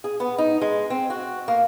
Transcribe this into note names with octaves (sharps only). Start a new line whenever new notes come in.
G#4
B3
D#4
G#3
C4
F#4
A#3